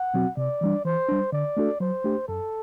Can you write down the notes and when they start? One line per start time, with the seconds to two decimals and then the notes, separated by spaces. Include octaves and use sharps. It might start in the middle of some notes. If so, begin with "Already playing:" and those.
Already playing: F#5
0.14 B2 F#3 C4 F#4
0.37 C3 D5
0.61 E3 G3 D4
0.85 E3 C5
1.08 G3 D4
1.32 D3 D5
1.57 A3 D4 F#4 A4
1.80 F#3 C5
2.04 A3 D4 G4
2.28 F#2 A4